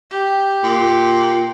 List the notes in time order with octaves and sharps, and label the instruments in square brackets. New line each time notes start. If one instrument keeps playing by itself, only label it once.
[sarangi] G4
[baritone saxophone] A#2